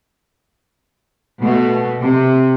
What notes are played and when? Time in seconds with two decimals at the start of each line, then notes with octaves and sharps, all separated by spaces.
1.42 B2 A3
2.01 C3